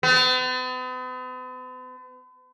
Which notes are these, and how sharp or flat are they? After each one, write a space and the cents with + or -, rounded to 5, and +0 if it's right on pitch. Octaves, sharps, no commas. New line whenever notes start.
B3 +45